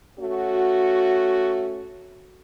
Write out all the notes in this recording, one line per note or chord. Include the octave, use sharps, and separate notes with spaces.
A3 C#4 F#4